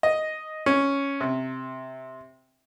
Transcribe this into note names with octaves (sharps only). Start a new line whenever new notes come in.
D#5
C#4
C3